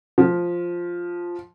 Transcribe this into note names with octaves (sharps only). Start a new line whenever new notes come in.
F3